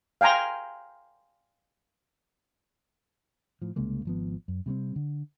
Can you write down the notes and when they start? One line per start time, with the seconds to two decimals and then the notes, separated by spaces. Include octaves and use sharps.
0.21 F5 G5 G#5 A#5 C6
3.62 A2 F3
3.76 C2 C#3 G#3 A#3
4.05 G#1 F3 B3
4.48 F#2
4.66 C3 G3 A3 C4
4.96 D3